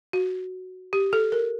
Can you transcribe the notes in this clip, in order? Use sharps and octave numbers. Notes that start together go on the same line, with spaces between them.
F#4
G4
A4
A#4